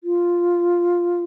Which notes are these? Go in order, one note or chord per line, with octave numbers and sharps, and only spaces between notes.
F4